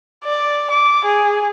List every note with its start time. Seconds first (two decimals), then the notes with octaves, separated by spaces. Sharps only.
0.25 D5
0.70 D6
1.04 G#4